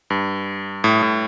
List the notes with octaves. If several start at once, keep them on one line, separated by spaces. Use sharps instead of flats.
G2
A2
A2